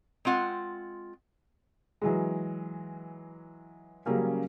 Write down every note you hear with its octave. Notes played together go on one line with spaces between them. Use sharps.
G#3 C4 F4 F#5
E3 F#3 G#3
C#3 F#3 G3 A#3 C#4